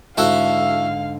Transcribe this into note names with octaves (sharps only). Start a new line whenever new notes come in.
G#2 D3 E4 F#4 A4 F5